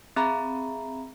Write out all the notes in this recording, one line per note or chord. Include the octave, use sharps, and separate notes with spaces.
C4 G#4 E5 A#5 B5